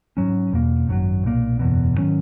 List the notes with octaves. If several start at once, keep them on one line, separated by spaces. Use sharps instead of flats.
G#2 F#3 C#4
E2 B2 A#3
G#1 F#2 D#3 F#3
B1 A#2 A#3
F#1 E2 B2
G#2 D#3 F#3 C#4